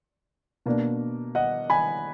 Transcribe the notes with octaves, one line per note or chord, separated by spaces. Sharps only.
B2 A#3 D4
D#5 F#5
G#5 B5